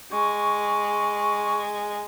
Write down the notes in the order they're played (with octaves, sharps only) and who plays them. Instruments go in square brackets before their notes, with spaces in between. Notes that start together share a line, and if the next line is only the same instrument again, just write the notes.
[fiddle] G#3 [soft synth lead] C#6